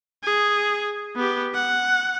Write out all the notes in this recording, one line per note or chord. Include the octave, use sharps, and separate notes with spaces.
G#4
B3 G4
F#5